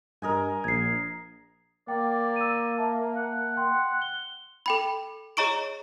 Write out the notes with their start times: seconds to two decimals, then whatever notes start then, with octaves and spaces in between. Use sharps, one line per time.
0.22 G2 A#4 D#5 G#5
0.64 A#1 G#6 C7
1.88 A#3 D5 G5 D6
2.36 E6 D#7
2.78 E5 A5
3.16 F#5
3.57 G5 C6
4.02 G7
4.66 A4 G5 B5
5.37 G#4 C#5 D#5 A#5 C#6 D7